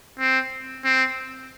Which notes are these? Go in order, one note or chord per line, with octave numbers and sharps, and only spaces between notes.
C4
C4